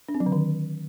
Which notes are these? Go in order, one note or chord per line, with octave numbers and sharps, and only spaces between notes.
D4
C4
F#3
D3
D#3